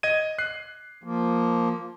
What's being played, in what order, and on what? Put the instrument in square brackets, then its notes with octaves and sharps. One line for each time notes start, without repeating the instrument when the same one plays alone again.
[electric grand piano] D#5 G#6 D#7
F#6 C7
[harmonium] F3 A#3